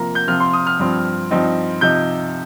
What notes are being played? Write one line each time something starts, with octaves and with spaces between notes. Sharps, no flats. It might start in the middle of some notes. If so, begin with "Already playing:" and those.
Already playing: C3 F3 A#3 F4 A#5
G6
C3 F3 C4 F4 F6
C6
D#6
F6
G2 F3 C4
G2 F3 C4 D#4
C3 F3 D#4 G6